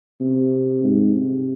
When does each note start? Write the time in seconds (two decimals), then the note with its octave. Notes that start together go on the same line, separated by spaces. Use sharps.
0.21 C3
0.84 G#2
1.16 C3